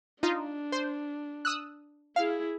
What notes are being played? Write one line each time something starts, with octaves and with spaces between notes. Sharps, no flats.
D4 D#4 F4
C5
D#6 E6 F#6
E4 G#4 F5